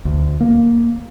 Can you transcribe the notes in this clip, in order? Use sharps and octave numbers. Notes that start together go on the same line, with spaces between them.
D2
A#3